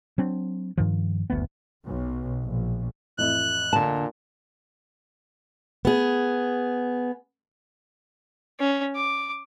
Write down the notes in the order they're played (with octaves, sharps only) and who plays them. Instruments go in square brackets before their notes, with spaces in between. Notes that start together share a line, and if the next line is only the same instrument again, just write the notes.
[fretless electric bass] F#3 C4 D4
G2 D#3 F3
F#1 D2 A3 B3
[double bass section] B1
A#1
[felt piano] A1 F2 E4 [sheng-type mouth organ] F#6
[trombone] A#2 [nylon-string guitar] D3 A5
[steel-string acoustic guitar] B3 G#4
[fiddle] C#4
D6